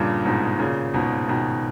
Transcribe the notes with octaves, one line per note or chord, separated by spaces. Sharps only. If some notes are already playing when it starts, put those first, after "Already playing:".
Already playing: G2 A#2 C#3
G#2 B2
A#2 C#3
G#2 B2
B2 D#3